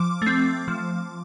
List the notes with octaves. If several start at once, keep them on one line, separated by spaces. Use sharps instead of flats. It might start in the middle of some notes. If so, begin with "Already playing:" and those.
Already playing: F3 D6
A3 C4
F3